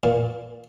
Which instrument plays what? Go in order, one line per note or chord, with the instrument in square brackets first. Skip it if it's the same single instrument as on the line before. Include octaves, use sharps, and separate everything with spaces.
[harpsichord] A#2